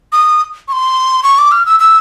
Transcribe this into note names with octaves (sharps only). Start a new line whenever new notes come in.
D#6
C#6
C6
C#6
D6
F6
E6
E6